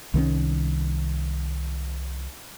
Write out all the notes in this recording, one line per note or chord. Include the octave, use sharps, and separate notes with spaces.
C2 D#3 F#3 C#4